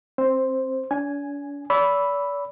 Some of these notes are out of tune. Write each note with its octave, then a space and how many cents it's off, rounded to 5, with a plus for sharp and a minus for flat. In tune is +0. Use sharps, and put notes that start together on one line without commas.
C4 +20 C5 +0
D4 -45 G#5 +0
D5 -40 B5 +0 E6 +0